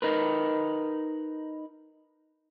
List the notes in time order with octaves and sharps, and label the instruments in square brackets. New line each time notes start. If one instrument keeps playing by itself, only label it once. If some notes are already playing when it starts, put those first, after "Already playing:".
[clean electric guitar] D#4 A#4 B4